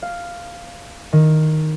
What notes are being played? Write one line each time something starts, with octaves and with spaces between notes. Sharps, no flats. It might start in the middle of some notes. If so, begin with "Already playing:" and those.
F5
D#3